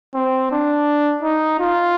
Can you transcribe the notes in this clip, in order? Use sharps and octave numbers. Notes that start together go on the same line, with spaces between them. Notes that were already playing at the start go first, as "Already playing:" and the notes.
C4
D4
D#4
F4